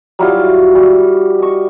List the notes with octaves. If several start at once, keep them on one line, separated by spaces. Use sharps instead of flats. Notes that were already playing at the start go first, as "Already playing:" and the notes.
F#3 G3 E4 F4
G3 F#4
D#5 C#6